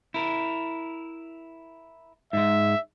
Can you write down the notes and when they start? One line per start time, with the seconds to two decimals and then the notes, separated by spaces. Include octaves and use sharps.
0.14 E4 A#4
2.33 G#2 G#3 E5